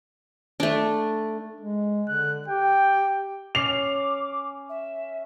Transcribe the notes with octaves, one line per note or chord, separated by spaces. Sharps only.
A3 D4
G#3
D3 F#6
G4 G5
C#4 D6 C7 F7
E5